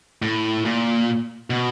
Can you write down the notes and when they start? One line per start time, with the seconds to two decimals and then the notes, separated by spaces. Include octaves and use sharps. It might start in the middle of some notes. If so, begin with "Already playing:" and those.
0.22 A2
0.65 A#2
1.50 B2